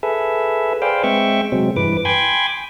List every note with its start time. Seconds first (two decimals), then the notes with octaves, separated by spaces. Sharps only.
0.03 G#4 A4 B4 E5
0.82 G#4 B4 C5 D5 F5 G5
1.04 G#3 C4 E5 G5 C#6
1.52 C3 F#3 G#3 C4
1.76 G2 E3 B4 D6
2.05 G5 G#5 B5 C6 D6 G#6